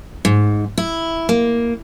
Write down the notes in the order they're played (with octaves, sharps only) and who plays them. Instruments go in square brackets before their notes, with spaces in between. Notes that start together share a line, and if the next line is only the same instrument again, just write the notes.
[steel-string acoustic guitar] G#2
E4
A#3